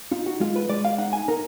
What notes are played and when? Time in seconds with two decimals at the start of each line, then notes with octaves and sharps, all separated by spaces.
0.12 D#4 F4
0.26 F#4
0.40 G#3 F4
0.56 B4
0.69 G#3 D5
0.85 F5
0.98 D#4 F#5
1.13 G#5
1.28 D#4 A#4